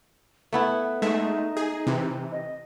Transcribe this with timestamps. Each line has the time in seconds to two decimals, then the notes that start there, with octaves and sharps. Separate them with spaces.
0.53 A3 B3 E4 B4
1.02 G#3 A3 D#4 E5
1.57 G#4
1.87 C3 E3
2.32 D#5